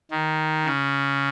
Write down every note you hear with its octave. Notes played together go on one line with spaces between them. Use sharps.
D#3
C#3